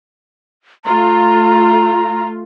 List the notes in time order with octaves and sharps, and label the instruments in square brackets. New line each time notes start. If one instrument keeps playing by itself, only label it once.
[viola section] A3 F4 [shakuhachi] A#5